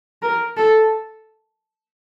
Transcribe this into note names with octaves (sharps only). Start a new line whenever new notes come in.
A#4
A4